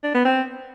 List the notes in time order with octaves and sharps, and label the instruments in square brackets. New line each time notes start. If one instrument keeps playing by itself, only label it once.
[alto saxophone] D4
B3
C4